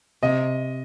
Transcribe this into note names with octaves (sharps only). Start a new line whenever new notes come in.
C3 D#5